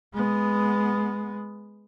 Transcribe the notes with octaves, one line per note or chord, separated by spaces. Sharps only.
G#3 B3